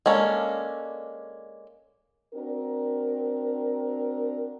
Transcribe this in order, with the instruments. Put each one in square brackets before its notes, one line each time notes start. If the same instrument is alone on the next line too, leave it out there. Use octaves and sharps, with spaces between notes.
[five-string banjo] G#3 A#3 C#4 D4 A4
[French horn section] C4 D4 F#4 A#4